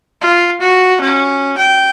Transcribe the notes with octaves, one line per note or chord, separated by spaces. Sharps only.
F4
F#4
C#4
G5